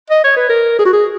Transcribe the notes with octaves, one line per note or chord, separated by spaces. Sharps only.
D#5
C#5
B4
A#4
G#4
F#4
G#4